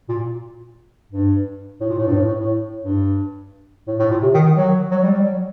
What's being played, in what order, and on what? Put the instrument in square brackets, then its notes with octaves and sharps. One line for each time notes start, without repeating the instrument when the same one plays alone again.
[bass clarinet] A#2
G2
A2
A#2
A2
G2
A2
A2
A2
G2
A2
A2
A#2
C3
D#3
D#3
F#3
F#3
G3
G3
F#3